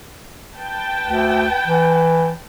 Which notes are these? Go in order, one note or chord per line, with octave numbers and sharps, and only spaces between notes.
B4 G5 A5
D2
E3